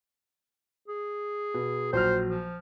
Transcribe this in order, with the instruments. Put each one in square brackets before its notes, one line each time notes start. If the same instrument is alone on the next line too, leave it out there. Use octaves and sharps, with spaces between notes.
[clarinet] G#4
[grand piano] B2
[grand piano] A#1 F#3 F6 [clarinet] C5
[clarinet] F3